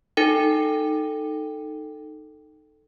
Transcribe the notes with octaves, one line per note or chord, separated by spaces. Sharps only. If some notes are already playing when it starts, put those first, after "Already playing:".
D#4 A4 G5